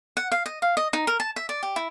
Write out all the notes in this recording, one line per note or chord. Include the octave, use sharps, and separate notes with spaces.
F#5
F5
D#5
F5
D#5
D#4
A#4
A5
E5
D5
G4
E4